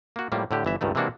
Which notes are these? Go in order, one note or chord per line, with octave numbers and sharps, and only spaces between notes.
A#3 F#4
A2 F3 G3 A#3
A2 D3 G4
G1 E3 E5
C#2 G2 D#3 A3
C3 E3 G#3 A#3 D4 F#4